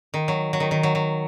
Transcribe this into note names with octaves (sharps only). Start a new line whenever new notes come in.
D#3
F#3
F#3
D#3
D#3
F#3
F#3